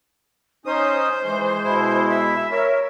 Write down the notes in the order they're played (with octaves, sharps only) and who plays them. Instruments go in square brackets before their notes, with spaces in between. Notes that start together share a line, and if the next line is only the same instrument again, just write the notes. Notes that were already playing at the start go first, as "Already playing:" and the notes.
[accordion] C#4 D#4 D#6 [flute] C5
[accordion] E3 [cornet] G#3
[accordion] B2 E4
[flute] E5
[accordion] A#4 [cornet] C#5